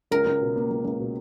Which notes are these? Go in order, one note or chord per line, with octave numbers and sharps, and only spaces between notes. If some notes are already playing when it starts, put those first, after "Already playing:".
C#2 A#4
C#2
B2
A#3
C#2
C#2
B2